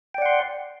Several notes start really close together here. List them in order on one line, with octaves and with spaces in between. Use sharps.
G5 D5 F#5 C6